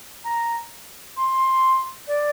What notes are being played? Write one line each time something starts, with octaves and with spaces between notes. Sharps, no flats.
A#5
C6
D5